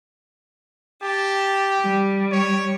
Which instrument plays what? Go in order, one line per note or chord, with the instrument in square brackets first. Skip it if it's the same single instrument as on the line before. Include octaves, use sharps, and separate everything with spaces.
[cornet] G4 [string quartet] A5
[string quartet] G3
[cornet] C#5